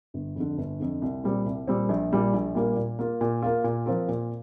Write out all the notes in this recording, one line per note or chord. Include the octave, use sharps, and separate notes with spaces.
G1
F2 D3
G1
F2 D3
C2
A#2 G3 C4
C2
A#2 G3 C4
A#1
A#2 G3 A#3
A#1
A#2 G3 A#3
A#2
A#3 F4
A#2
A#3 F4
A#2
F3 C4 F4 A#4
A#2